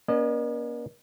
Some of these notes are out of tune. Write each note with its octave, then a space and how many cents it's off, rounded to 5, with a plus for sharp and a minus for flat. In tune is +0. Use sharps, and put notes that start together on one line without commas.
A#3 +40 C#4 +30 D#5 -40